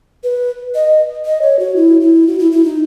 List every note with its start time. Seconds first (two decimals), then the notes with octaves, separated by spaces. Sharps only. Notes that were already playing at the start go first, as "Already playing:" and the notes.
0.24 B4
0.75 D#5
1.25 D#5
1.42 C#5
1.59 F#4
1.76 E4
2.01 E4
2.27 F#4
2.39 E4
2.52 E4
2.65 D#4